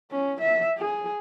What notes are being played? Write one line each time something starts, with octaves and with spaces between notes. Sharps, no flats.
C#4
E5
G#4